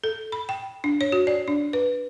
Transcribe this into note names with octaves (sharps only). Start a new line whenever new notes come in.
A4
B5
G5
D4
C#5
F#4
D5
D4
B4